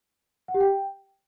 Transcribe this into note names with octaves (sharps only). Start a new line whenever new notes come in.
F#5
G4
G5